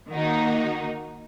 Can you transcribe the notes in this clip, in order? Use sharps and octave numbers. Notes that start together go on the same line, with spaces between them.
D#3 A#3 D#4 F#4